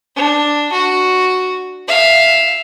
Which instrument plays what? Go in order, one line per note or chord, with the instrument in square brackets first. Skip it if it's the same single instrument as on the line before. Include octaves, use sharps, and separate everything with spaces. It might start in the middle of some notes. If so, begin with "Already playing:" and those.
[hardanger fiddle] D4
F#4
E5 F5